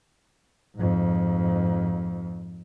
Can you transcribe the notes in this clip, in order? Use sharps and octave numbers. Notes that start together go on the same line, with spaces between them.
F2 G#2